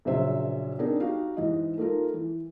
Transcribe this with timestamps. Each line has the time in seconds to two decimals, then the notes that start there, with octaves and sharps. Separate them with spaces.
0.05 A#1 A#2 C#3 F#3 C5 E5
0.79 B3 C4 D4 D#4 G#4 A#4
1.00 D#4 F#4 G4 F5
1.37 G#2 E3 D#5
1.78 A3 A#3 D#4 F4 A#4
2.14 E3